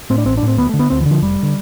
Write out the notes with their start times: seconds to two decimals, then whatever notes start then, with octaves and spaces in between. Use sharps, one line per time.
0.10 A2 C4
0.18 D4
0.25 A1 C4
0.37 D4
0.43 A2
0.48 C4
0.57 D2 B3
0.69 A3
0.74 D3
0.79 B3
0.90 D2 C4
1.01 E3
1.06 D3
1.11 F3
1.22 F1 G3
1.43 D3